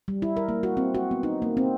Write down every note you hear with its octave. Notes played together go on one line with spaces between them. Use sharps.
G3
E4
A#4
A#3
F#4
C4
F#4
B3
D#4
A#3
C4